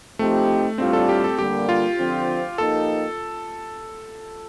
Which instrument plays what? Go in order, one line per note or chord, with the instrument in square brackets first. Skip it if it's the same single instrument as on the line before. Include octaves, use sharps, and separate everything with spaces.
[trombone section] F3 C4 D#4 G4 [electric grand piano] A3
[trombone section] A2 G3 D4 F4 [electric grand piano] C4
[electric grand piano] A4
G4
A4
[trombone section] D3 G3 A#3 [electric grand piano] G4
[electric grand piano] F4
[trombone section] D3 F3 C4
[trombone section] F3 A#3 D#4 G4 [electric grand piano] A4